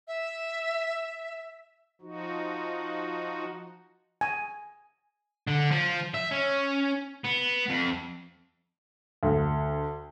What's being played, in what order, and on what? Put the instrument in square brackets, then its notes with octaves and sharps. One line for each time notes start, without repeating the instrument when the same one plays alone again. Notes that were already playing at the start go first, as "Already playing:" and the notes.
[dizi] E5
[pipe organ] F3 D#4 F#4
[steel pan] G#5
[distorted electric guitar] D3
F3
E5
C#4
B3
F2
[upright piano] D2